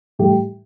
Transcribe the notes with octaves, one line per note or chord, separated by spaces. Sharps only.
A2 E3 G3 G4